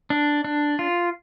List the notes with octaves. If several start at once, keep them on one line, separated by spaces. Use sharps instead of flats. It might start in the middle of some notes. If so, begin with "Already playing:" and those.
D4
D4
F4